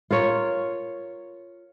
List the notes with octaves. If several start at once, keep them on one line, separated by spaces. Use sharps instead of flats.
F4 A#4 C#5